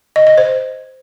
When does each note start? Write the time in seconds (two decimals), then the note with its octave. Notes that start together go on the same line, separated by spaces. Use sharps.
0.16 D#5
0.27 D#5
0.38 C5